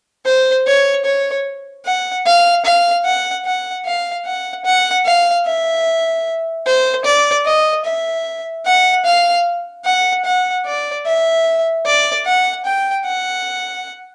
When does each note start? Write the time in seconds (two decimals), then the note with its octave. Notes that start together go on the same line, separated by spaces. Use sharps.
0.25 C5
0.67 C#5
1.05 C#5
1.86 F#5
2.26 F5
2.65 F5
3.05 F#5
3.45 F#5
3.85 F5
4.26 F#5
4.65 F#5
5.05 F5
5.46 E5
6.66 C5
7.05 D5
7.46 D#5
7.85 E5
8.66 F#5
9.05 F5
9.85 F#5
10.25 F#5
10.66 D5
11.06 E5
11.86 D5
12.26 F#5
12.65 G5
13.05 F#5